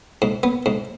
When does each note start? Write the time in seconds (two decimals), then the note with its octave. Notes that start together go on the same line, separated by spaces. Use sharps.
0.22 G#2
0.43 B3
0.66 G#2